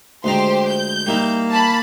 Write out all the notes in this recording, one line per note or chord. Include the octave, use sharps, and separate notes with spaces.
D2 G#3 G4 C5 A#5 C6
G6
G3 A#3 D#4 E4
A5 B5